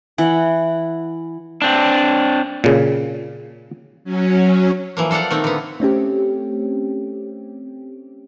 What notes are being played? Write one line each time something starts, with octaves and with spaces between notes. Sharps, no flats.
E3 F#5
C4 D4
A#2 C#3
F#3 C#4
E3 F3 A#3
F4 A4 D5 F5 F#5
D#3 A3 A#3 C4
D3 B3
A3 C4 C#4 G4